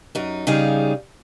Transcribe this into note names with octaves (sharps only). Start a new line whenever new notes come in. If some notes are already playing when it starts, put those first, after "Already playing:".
F#2 D#4
C#3 G3 D#4 G#4 F5